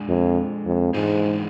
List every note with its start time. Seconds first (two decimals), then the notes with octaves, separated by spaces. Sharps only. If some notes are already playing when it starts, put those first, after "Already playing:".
Already playing: G#3 D4 G#4
0.08 F2
0.66 F2
0.94 G#2 E3 G#3 D4 G#4 C5